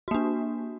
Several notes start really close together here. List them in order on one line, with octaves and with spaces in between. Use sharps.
F#4 A#3 D4